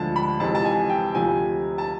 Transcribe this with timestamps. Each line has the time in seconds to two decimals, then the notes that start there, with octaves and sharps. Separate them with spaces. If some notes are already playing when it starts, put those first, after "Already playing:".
Already playing: D2 D3 F3 G#3 A5
0.16 B5
0.40 F2 C3 E3 G#3 A5
0.55 A5
0.65 G#5
0.89 G5
1.14 D2 C3 F3 G#5
1.78 A5